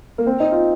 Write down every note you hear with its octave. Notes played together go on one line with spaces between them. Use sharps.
A#3
C4
D#4
F4